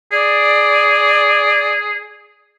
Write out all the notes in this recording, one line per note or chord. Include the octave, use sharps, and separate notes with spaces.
G#4 D5